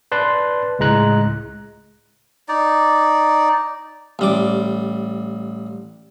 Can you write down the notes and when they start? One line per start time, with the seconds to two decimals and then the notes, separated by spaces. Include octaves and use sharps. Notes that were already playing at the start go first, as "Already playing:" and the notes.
0.12 B4 D5 A5 C6 F#6
0.79 C#2 A2 G#3 A#5 F#6
2.48 D#4 D5
4.19 A1 G3 D6